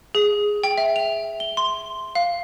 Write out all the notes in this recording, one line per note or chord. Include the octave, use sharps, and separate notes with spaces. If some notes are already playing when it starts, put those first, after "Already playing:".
G#4
G5
E5
F7
G7
C6
F5